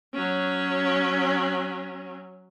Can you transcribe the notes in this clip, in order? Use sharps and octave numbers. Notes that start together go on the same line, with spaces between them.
F#3 C#4